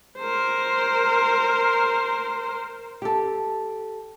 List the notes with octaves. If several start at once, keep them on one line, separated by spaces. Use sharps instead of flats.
A#4 C5
G4 A4